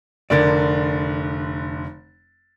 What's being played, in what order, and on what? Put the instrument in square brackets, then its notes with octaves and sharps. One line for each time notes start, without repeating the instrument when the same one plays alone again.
[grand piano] F1 D3 A6 [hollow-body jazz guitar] A#4 D5